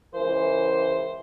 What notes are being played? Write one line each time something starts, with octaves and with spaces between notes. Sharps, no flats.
C#2 E3 A#4 C5